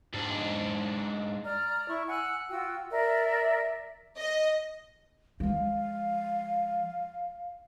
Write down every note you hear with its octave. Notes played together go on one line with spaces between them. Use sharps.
G#2 D4
D5 A#5 F6
E4 C#6
F#5 G#5 E6 F#6
F4 F#4 G5 E6
A#4 D5 E5
D#5
F3 G#3 F5